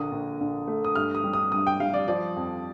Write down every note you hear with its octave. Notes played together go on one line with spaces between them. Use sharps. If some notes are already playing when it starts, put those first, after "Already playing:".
Already playing: A#1 D3 A#3 D#6
A#1
A#1
A3
D#6
G2 F6
D#6
G3
D#6
G2 D#6
G5
G3 F5
D5
F3 D5
F2